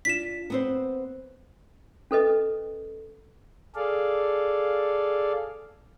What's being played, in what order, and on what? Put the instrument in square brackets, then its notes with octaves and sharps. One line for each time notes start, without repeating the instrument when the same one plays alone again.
[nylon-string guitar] D4 F4 [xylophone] B6 E7
[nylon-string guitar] B3 C4 C5
[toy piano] C#4 A4 B4 D#5
[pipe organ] G#4 A4 D5 F5